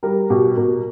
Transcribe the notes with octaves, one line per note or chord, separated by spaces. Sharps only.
G3 A#4
B2 G4
B2 A#4